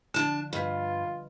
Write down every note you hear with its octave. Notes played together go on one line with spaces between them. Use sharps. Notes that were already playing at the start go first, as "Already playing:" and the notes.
D3 F3 D4 A5
G2 F4 B4 D#5